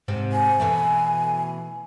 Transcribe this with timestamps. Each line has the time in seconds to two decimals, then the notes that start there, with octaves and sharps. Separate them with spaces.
0.08 G#2 C3 C4
0.32 G#5
0.60 B2 E3 A3